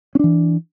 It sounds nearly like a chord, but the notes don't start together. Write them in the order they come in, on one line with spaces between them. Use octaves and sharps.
C#4 D4 E3